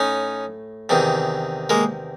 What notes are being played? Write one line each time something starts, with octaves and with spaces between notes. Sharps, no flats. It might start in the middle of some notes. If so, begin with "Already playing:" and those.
Already playing: A2 C#4 D#4
E2 C3 D#3
G#3 A#3